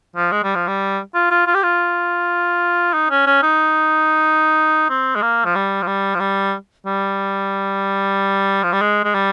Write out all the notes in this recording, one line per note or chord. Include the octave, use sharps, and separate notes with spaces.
F3
G#3
G3
F3
G3
F4
F4
F4
G4
F4
D#4
C#4
C#4
D#4
C4
G#3
A#3
F3
G3
F3
G3
F3
G3
G3
F3
G3
G#3
G#3
G3